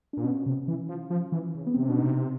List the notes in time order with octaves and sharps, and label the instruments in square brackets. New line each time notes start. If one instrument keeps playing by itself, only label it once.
[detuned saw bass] A#2 [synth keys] D4
[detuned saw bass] B2 [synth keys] C#4
[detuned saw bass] C3
E3
F3
F3
E3
C#3
[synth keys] B3
[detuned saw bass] C3 [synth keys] C4
[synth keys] C#4
[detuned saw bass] B2 [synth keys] D4
[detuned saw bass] C3 [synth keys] D#4